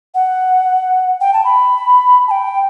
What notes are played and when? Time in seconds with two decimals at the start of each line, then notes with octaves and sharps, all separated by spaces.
0.15 F#5
1.21 G5
1.33 A5
1.44 B5
2.27 A5
2.31 G5